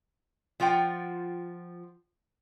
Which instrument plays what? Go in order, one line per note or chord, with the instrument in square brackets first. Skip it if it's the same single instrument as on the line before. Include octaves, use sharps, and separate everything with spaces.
[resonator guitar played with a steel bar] F3 F4 F#5 G5